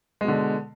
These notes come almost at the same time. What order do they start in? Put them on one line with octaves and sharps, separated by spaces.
G#3 B2 D3